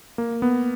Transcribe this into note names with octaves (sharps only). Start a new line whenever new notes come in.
A#3
B3